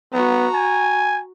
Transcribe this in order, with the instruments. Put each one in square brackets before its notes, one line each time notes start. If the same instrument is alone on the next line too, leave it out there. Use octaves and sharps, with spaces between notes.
[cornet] B3 [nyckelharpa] F#4 A#5
[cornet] G#5